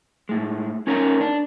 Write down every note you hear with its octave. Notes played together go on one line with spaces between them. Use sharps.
A2 G#3
C#4 D#4 A#4 C#5 E5 A#5
D4